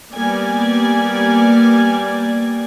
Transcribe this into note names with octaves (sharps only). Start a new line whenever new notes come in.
G3 A#3 B3 D5 G#5